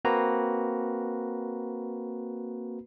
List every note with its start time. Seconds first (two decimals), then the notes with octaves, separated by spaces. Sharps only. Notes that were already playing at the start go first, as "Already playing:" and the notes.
0.05 A#3 C4 F#4 B4 A#5